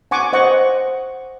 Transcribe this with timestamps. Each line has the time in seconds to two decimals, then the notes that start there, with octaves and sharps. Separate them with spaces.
0.11 F#5 G#5 C#6 D6
0.33 C5 D#5 F#5 C#6